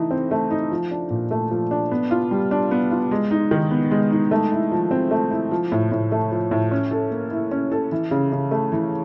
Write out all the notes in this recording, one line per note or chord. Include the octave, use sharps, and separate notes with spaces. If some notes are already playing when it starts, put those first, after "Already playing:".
Already playing: E3 A3 D#4
C4
A3
D#4
F3
D4
A#2
A3
F3
D4
B3
F4
G3
D4
B3
F4
G#3
D#4
D#3
B3
G#3
D#4
A3
E4
F3
C4
A3
E4
F3
A2
A2
A3
F3
A2
C#4
A4
A#3
E4
C#4
A4
E3
C#3
C#3
A3
E3